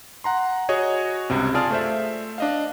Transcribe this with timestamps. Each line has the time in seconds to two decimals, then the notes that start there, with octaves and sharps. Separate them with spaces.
0.24 F#5 A#5 C6
0.69 F#4 G#4 C#5 D#5
1.30 C#2 G2 C3
1.54 F4 G#4 D5 A5 F6
1.70 A3 C5 E5
2.38 D4 D#5 F5